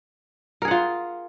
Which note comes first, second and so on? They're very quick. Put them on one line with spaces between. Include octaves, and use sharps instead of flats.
A#4 G#4 F#5 F4